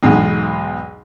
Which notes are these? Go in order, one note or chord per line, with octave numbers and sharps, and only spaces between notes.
B1 E2 G#2 B2